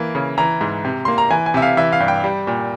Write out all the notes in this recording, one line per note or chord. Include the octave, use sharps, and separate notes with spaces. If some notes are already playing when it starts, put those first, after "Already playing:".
Already playing: E3 A#3
C#3
E3 A#5
G#2
C3
A#3 C6
A#5
E3 G#5
G#5
C3 E5
F5
E3 E5
F5
G2
G5
G3
A#2